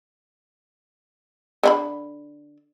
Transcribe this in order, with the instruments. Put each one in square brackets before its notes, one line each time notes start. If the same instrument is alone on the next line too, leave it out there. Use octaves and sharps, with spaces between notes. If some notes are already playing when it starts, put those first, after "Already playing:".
[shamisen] D3 D#4 B5